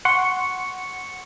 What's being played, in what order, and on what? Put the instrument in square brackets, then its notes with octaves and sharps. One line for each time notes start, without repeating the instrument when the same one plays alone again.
[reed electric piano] F#5 C6 C#6 [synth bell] C#7